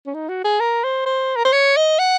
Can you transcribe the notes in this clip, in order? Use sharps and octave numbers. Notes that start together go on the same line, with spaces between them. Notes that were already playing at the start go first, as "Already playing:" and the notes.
C#4
D#4
F#4
G#4
A#4
C5
C5
A#4
C5
C#5
D#5
F#5